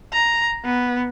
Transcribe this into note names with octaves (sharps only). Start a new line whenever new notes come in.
A#5
B3